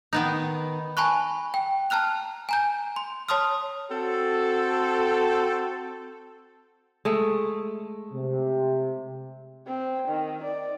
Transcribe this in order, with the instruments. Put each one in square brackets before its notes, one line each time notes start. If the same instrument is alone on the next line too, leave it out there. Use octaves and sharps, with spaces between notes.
[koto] D#3 B3 D#4
[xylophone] G#5 A5 B5 C#6 F#6
G5
A5 A#5 F6 F#6 F7
G#5 A#5 G6
C6
C#5 A5 C6 D#6 F6
[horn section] C4 F#4 A4
[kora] G#3 A3
[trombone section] C3
[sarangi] C4
D#3
D5